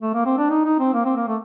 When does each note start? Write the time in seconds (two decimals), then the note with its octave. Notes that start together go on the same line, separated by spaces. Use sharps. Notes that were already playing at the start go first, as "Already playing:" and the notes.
0.02 A3
0.14 A#3
0.26 C4
0.38 D4
0.50 D#4
0.65 D#4
0.79 C4
0.94 A#3
1.05 C4
1.16 A#3
1.28 A3